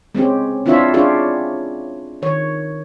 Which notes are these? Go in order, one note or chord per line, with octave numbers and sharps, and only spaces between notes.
G#3 C4 C#4 G4
C4 D4 E4 F4 C#5 E5
C#4 D4 F4 G4 G#4 C#5
D#3 C#5